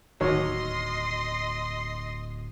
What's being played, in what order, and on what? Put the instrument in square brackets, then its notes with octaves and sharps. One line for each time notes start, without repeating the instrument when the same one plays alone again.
[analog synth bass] D1 [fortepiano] D#2 F#3 C#5 [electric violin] D#5 C6